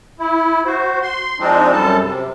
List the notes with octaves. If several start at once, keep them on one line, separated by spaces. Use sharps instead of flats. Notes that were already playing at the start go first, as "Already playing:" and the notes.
E4
F#4 C5
C6
F3 G#3 C4 D4 D#4
F#2 G3 A4 A5
C3